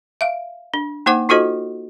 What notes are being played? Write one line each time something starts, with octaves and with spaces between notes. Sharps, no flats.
E5 F5
D4
A#3 D#4 C5 F#5 D6
D#4 F4 F#4 A4 C5 D#5